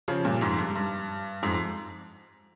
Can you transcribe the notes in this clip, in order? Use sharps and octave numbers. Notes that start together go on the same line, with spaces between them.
C#3 F3
G2 A#2
F2 G#2
G2
G2
F2 G#2